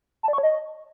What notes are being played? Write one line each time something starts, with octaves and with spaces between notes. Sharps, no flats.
A5
D5
C#6
C#5
D#5